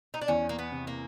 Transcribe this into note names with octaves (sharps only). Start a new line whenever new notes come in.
D#4
D4
E2 C#4
A#3
B3
C3
A#3